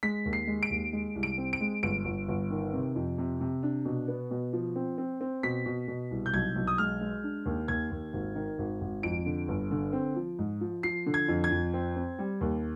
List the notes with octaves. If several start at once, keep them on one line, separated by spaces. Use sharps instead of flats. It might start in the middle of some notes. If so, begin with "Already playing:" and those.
G#3 B6
D#2
C7
G#3
D7
D#2
G#3
C2
D7
C4
D7
G#3
G1 D7
G1
G1
D#3
C3
F2
C3
C3
D4
B2
B3
B2
F3
C4
C4
C4
B2 B6
B2
B2
C2
G6
B1 G#6
B1
D#6
G#3 F6
G#3
D4
D#2
D#2 G#6
D#2
G#1
D#3
G#1
G#1
F2 D7
D3
G1
D3
C4
F3
G#2
F3
F3 C7
D3
G#6
F2
G#6
F2
C4
C4
G3
D#2